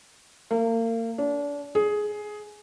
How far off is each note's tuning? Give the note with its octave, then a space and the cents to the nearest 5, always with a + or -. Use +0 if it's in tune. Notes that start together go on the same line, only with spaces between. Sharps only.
A#3 -35
D4 -30
G#4 +10